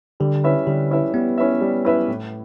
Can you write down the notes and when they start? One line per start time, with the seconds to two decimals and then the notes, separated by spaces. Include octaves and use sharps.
0.20 D3 G3
0.44 C#4 E4 B4 E5
0.66 D3 G3
0.91 C#4 E4 B4 E5
1.14 G3 B3
1.38 C#4 E4 B4 E5
1.61 G3
1.85 C#4 E4 B4 E5
2.08 A2